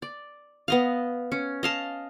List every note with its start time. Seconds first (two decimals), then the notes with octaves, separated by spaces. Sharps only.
0.02 D5
0.68 B3 D#5 F5
1.32 C#4
1.63 D#5 F5 A5